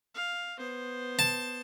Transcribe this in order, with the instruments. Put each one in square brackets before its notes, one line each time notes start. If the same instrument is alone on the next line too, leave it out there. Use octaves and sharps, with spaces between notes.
[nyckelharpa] F5
B3 C5
[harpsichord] A5